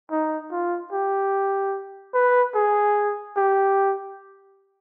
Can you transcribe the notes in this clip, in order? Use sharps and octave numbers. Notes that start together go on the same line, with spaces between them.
D#4
F4
G4
B4
G#4
G4